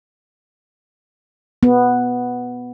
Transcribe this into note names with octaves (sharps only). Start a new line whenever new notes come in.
B3